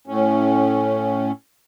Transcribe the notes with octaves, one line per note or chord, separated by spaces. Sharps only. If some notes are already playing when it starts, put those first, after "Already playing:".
A2 C#4